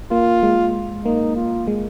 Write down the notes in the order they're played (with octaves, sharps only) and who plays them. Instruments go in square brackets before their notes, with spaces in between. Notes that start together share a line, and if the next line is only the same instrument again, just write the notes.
[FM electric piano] A#3 [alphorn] F4
[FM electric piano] G#3
[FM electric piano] A#3 [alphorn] D#4
[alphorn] F4
[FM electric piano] G#3